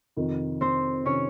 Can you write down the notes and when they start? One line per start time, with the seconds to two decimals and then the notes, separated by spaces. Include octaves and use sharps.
0.17 F2 C3 D#3
0.61 C4 C5
1.05 C3 D#3 C#4 C#5